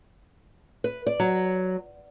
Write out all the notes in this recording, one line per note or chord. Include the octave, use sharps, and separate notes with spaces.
B4
D5
F#3